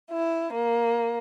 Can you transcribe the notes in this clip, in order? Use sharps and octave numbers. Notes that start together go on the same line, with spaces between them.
E4
A#3